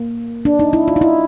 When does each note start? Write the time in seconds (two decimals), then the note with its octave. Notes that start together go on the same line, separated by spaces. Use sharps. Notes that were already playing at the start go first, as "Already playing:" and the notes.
Already playing: A#3
0.45 D4
0.59 D#4
0.73 E4
0.88 F4
0.96 D#4
1.01 E4